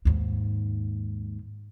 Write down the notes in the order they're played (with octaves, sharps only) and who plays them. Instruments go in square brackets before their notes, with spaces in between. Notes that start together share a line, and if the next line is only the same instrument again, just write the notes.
[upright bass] D#2 G#2